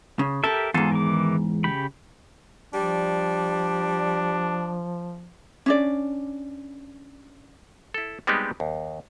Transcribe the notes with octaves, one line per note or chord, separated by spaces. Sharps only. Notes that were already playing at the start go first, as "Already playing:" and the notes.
C#3
G4 A4 A#4 E5
E2 G#2 F4 G#4 A4
D#3 E3 D6
C#3 G4 B5
F3 G3 D4
C#4 D4 D5
E4 A4
G3 G#3 B3 C4 D#4 G4
D#2